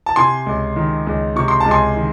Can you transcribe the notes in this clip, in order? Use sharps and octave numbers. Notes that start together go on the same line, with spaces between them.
A5
C3 G#5 C6
C#2
D#3
C#2
C3 C#6
C6
A5
C#2
G#5 C6
D#3